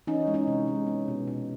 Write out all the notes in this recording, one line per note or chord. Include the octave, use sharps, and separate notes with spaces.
E3 C#4 D#4
G#3
C#4 D#4
C3
G#3
B3
B2
B2